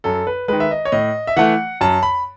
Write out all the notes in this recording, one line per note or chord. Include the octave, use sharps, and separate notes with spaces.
F#2 A4
B4
D#3 G#3 B4
E5
D#5
C#5
A2 D#5
E5
E3 A3 F#5
F#2 A5
B5